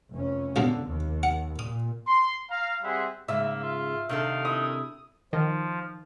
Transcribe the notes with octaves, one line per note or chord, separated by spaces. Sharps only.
F1 F2 C#4
A#1 F#2 B2 D3
D#2
F#5
A#2 D#6
C6
F5 A#5
G3 C4 G#4 E5 F#5 C6
G#2 C#3 A#3 E5
F4
C3 D#3 D4 A4 F5
E4 D#6
D#3 F3